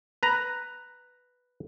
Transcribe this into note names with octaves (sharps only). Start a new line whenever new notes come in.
B4 A#5